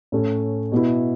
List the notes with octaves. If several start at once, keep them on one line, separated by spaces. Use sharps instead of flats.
A2 A3 C#4
B2 B3 E4